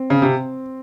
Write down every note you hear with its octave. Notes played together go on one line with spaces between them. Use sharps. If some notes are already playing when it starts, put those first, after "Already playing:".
Already playing: C4
C#3
C3